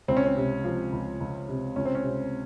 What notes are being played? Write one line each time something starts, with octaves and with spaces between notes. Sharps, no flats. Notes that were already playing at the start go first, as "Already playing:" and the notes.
C#2 C4
C#4
C4
C3
F3
C#2
C#2
C3
C#2 C#4
C4
C#4
C3